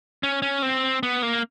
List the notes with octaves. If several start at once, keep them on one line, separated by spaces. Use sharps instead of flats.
C#4
C#4
C4
B3
A#3